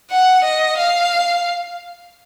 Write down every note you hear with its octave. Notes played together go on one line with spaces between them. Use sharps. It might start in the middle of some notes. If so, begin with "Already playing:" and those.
F#5
D#5
F5